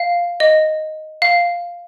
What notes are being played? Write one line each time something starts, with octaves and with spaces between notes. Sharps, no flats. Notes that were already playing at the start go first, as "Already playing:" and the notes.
Already playing: F5
D#5
F5